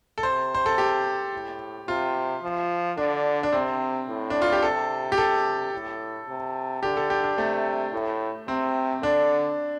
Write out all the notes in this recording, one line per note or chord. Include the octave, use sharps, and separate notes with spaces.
A4
C3 C5
C5
A4
G4
A2
C3 F4
F3
D3 D4
D4
C3 C4
A2
D4
F4
G4
C3 A4
G4
C3 A4
A2
C3
D3 G4
A4
G4
D4
C3 A3
A2
C3 C4
D3 D4